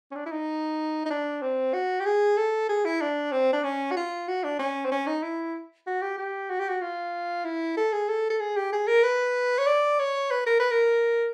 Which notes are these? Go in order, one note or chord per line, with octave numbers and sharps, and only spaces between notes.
C#4
D4
E4
D#4
D#4
D4
C4
F#4
G4
G#4
A4
G#4
E4
D4
C4
D4
C#4
F#4
F4
F#4
D4
C#4
C4
C#4
D#4
E4
F#4
G4
G4
F#4
G4
F#4
F4
E4
A4
G#4
A4
A4
G#4
G4
G#4
A#4
B4
C#5
D5
C#5
B4
A#4
B4
A#4